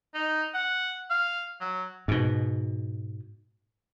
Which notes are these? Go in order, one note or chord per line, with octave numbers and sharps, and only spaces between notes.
D#4
F#5
F5
F#3
G#2 B2